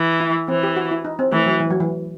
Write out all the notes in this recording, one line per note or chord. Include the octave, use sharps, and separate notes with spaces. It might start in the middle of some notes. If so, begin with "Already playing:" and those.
Already playing: E3
E4
E3 C4
G4
F#4
E4
D#4
C4
E3 A3
F#3
E3
F#3
E3